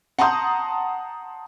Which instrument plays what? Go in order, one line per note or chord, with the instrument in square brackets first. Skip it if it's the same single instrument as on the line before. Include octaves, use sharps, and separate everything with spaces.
[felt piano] F#5 A5 A#5 C6 D#6 G6